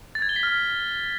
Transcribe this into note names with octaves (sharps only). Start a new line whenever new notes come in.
A6
G#6
G7
B6
F6